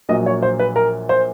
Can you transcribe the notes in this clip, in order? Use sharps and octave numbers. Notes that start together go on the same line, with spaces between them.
A#1 A#2 F#3 D#5
C#5
C5
B4
A#4
C5